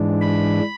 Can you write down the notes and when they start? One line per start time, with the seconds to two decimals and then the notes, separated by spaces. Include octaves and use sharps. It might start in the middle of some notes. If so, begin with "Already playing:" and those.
Already playing: G#2 E3 G#3 D4
0.21 B5